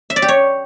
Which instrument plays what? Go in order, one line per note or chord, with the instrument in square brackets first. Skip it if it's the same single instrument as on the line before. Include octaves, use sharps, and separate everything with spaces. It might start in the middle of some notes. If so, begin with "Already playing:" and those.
[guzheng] E5
D5
G4
C#5